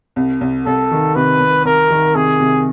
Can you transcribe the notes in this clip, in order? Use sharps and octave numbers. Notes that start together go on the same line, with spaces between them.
C2
C2
C2 A4
D#3
C3 B4
C2
C2 A#4
D#3
C3 G#4
C3